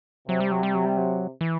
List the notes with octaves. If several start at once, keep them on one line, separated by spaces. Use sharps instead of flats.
C3 F#3
G3
F#3
G3
F#3
G3
F#3
E3